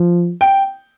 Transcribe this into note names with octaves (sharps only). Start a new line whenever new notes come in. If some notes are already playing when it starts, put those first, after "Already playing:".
Already playing: F3
G5